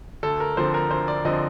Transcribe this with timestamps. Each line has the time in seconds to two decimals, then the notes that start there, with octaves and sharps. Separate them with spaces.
0.23 D2 A4
0.40 A#4
0.57 D3 F3 C4 C5
0.74 A#4
0.91 D2 C5
1.08 D5
1.25 D3 F3 C4 D#5